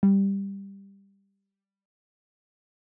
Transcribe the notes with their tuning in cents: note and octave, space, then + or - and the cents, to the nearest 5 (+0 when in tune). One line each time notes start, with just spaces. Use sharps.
G3 +10